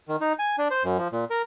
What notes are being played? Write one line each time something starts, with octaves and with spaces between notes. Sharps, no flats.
D#3
D#4
G#5
D4
C5
F#2
F3
A#2
A#4